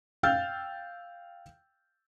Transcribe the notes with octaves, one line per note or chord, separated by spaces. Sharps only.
F5 G5 E6 F6 G6 A6